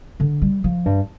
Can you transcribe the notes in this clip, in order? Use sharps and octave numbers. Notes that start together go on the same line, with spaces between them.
D3
G3
F3
G2